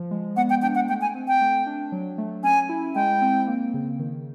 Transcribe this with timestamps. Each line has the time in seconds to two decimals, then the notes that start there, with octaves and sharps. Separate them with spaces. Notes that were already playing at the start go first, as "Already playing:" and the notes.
Already playing: F3
0.11 G#3
0.37 B3 F#5
0.50 G5
0.62 D4 G5
0.75 F#5
0.89 A3 G5
1.01 G#5
1.15 C4
1.28 G5
1.41 A3
1.66 D4
1.92 F#3
2.18 A3
2.43 C#4 G#5
2.69 E4
2.95 G#3 G5
3.21 C4
3.47 A#3
3.74 C#3
3.99 D#3